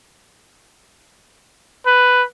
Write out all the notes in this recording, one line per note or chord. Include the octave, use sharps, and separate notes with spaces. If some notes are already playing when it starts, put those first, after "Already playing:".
B4